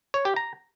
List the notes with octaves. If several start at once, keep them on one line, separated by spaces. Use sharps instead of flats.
C#5
G4
A#5